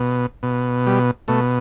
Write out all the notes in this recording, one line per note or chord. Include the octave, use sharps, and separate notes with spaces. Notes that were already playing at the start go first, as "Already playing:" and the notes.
Already playing: B2
B2
G3
B2 A3